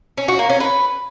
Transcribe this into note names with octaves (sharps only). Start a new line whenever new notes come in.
C#4
F#4
A#3
C#4
B4